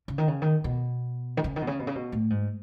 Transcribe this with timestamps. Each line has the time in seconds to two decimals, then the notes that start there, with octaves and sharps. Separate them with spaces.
0.08 C#3
0.18 D#3
0.28 C#3
0.42 D#3
0.64 B2
1.37 D#3
1.44 C#3
1.56 D#3
1.62 B2
1.67 C#3
1.79 B2
1.87 C#3
1.95 B2
2.12 A2
2.30 G#2